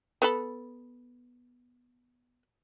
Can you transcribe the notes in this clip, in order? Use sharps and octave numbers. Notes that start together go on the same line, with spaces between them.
B3 A4 B5